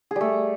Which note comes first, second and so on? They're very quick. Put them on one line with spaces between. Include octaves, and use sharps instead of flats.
G#4 G3 A3